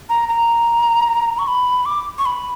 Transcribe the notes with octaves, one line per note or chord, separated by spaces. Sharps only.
A#5
A#5
C#6
B5
D6
C#6
B5